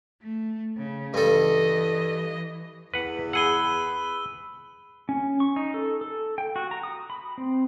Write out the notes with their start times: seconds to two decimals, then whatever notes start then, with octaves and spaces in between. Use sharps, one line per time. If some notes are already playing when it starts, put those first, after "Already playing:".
0.22 A3
0.77 C#3
1.14 G2 E3 A4 D#5
2.94 E2 B4 F#5
3.33 G#4 B4 F#5 E6 D#7 G7
5.09 C#4
5.40 C#6
5.56 D#4
5.74 A4
6.01 A4
6.38 G5
6.56 F#4
6.71 A#5
6.83 D#6
7.10 B5
7.38 C4